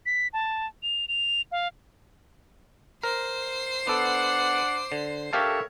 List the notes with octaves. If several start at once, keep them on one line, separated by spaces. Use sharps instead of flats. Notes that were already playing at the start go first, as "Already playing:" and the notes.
B6
A5
F7
F7
F5
A#4 C5 C7
B3 D4 A4 F#5 D6
D3
D4 G4 A4 A#4 C#5 E5 F5 A5